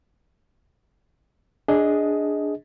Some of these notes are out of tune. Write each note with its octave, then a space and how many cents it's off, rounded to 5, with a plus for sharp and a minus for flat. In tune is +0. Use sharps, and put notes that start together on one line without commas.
D4 +0 G#4 +0 D#5 +20